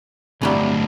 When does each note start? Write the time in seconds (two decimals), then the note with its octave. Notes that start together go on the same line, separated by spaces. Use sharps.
0.42 G1 D2 A2 C3 E3 F#3 G3